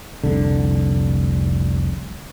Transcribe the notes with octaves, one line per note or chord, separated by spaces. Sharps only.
F1 C2 D3